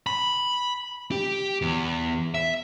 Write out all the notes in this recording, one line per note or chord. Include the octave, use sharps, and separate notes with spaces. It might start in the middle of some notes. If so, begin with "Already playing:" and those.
B5
G4
E2
E5